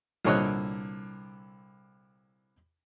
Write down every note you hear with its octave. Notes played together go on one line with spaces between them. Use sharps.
C2 A#2 D3 C#5 D#5 F#6